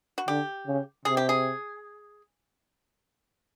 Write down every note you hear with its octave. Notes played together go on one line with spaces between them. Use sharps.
F#4
D3 G4
C#3
C3 G#4
G4
G#4